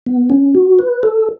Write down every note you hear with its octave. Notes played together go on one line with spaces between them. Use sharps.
B3
C#4
F#4
B4
A4